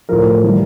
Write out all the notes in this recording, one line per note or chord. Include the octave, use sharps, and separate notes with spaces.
A2 F3 A#4
E3 G3